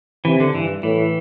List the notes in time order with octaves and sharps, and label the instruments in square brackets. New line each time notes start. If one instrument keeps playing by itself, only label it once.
[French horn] C3 [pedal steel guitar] E3
[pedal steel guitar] D3
[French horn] G2 [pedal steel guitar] E3
[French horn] A2 [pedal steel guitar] E3